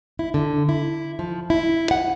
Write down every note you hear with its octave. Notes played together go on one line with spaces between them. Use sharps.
E4
D3
E4
F3
E4
F#5